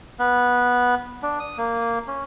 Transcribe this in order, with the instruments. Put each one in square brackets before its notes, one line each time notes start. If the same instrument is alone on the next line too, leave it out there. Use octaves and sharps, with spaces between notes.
[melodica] B3
D4
D#6
A#3
C#4